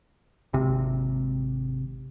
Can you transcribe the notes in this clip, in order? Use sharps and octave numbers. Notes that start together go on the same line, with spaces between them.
G#1 C3